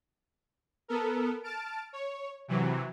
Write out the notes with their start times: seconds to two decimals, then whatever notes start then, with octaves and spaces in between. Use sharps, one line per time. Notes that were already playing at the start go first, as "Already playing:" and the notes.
0.88 B3 A4 A#4
1.43 A5 F6 A6 D7
1.93 C#5
2.48 C3 E3 F#3